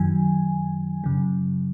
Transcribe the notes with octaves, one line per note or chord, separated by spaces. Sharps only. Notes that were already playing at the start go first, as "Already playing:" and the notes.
Already playing: F#2 D#3 F#3 G#5
F#2 C#3 F#3